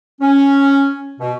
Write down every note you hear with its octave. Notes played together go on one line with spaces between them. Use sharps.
C#4
B2